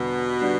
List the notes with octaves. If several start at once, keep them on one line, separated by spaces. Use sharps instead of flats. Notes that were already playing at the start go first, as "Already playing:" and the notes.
Already playing: E2 B2 D3 G3 D4
D3 G3 D4